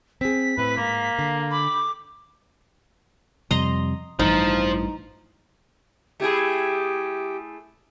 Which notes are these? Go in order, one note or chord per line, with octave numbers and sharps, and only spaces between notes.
C4 G#4 B6
A2 C4 B4
G#2 A#3 F5
D3
B5 D6
F2 C3 G3 D#5 A#5 C6
A1 G2 E3 F3 D#4
A3 E4 G4 G#4